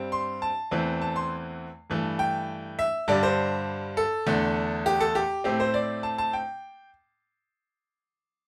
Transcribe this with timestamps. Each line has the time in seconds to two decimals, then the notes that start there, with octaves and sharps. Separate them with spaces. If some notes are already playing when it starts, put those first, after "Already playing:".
Already playing: G2 G3 C4
0.12 C6
0.42 A5
0.71 E2 E3 A3 C4
1.01 A5
1.16 C6
1.90 G2 E3 A3
2.19 G5
2.79 E5
3.08 G2 D3 G3 D5
3.23 C5
3.97 A4
4.26 E2 D3 A3
4.86 G4
5.01 A4
5.15 G4
5.44 A2 A3 C4 G4
5.60 C5
5.74 D5
6.03 A5
6.18 A5
6.33 G5